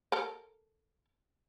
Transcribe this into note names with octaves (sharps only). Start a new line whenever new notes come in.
A4 A#4